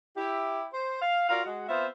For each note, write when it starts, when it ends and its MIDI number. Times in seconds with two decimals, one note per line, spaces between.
0.16 0.66 64
0.16 0.66 67
0.73 0.97 72
1.01 1.28 77
1.29 1.40 65
1.29 1.40 66
1.29 1.40 70
1.29 1.40 74
1.29 1.40 77
1.45 1.68 56
1.45 1.68 66
1.68 1.86 59
1.68 1.86 60
1.68 1.86 65
1.68 1.86 72
1.68 1.86 76